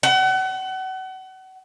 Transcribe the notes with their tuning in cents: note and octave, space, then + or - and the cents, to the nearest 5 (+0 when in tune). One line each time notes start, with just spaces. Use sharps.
F#5 +35